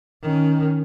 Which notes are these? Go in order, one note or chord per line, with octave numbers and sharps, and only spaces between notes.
D#3 C#4